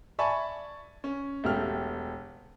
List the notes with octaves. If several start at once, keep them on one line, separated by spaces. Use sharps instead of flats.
D5 E5 G#5 A5 B5 C#6
C#4
E1 A3 G4 F6